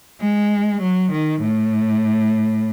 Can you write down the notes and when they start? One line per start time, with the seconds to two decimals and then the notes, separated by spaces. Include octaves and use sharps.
0.21 G#3
0.81 F#3
1.12 D#3
1.41 A2